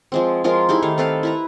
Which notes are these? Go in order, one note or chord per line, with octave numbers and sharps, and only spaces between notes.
F3 G#3 C4
F3 G#3 F4 A#4
D#4 E4 G4 G#4
D#3 A3 F5
C4 A4 B4 F5
E4 B4 A#5